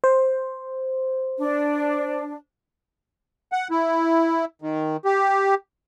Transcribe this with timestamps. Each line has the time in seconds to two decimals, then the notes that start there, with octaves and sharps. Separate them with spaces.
0.04 C5
1.40 D4
3.52 F#5
3.71 E4
4.62 D#3
5.05 G4